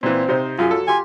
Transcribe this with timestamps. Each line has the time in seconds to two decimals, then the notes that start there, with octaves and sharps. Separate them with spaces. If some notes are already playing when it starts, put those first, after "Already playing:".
0.03 A#2 E3 C4
0.28 C3 D#4 C5
0.59 F#2 F4 G#4 G#5
0.71 F#3 A4
0.88 F4 G4 G#5 C6